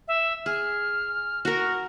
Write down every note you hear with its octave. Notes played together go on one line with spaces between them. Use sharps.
E5
G#4 F6
F#4 A#4 A#6